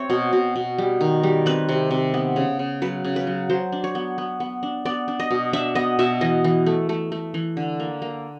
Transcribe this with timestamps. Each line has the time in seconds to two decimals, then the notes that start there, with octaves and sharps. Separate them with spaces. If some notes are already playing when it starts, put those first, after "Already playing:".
Already playing: C4 C#5 E5
0.10 B2
0.33 B2
0.56 B2
0.78 G3
1.01 D#3
1.23 G3
1.46 C4 B4
1.69 C3
1.91 C3
2.14 B3
2.36 C#3
2.59 C#3
2.82 F#3 B4
3.05 C#3
3.16 B4
3.27 F#3
3.50 F#3 C5
3.72 D4
3.84 C#5
3.95 B3
4.18 B3
4.40 B3
4.63 D4
4.85 B3 D5
5.08 D4
5.20 D#5
5.31 B2
5.53 D4 E5
5.75 B3 D#5
5.99 B2 E5
6.21 E3 D#5
6.44 E3
6.66 A3
6.89 A3
7.12 A3
7.34 E3
7.57 D3
7.80 A#3
8.02 A#3